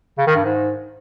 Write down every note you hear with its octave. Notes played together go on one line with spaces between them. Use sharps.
C#3
D#3
G2
G#2